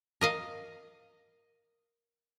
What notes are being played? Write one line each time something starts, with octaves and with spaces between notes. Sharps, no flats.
A#4 D#5 F5